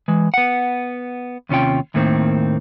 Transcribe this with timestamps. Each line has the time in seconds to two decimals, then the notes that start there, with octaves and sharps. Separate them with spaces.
0.08 E3 G#3
0.34 B3 F#5
1.49 D#2 C3 C#4 F4 G5
1.94 D#2 A2 D#3 A#3 C4